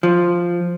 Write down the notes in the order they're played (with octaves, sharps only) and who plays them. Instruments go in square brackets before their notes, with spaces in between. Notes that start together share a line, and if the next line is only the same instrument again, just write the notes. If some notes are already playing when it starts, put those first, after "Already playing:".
[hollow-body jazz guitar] F3